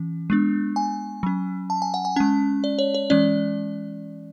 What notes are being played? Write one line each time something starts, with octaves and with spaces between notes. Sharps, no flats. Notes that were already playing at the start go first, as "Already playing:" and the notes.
Already playing: E3 C#4
G#3 B3 D4
G#5
F#3 C#4
A5
G#5
F#5
G#5
G#3 C#4 A5
D5
C#5
C#5
E3 G#3 C#4 D5